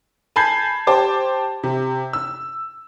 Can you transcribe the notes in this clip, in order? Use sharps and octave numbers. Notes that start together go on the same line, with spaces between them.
G#5 A5 B5 G6 G#6 C7
G4 C5 A5 D6
C3
E6